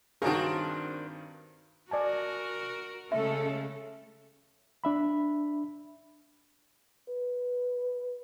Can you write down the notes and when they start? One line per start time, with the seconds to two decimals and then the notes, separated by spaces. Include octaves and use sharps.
0.22 G2 D#3 C4 D4 F#4 G#4 A#4
1.91 F#4 A#4 D5 G#5 A5
3.12 C#3 G#3 A3 C#4 A4 E5
4.84 D4 E5 B5
7.09 B4